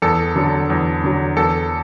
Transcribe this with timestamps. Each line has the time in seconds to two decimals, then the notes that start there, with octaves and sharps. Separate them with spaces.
0.02 E2 A4
0.36 D3 F#3
0.70 E2
1.04 D3 F#3
1.37 E2 A4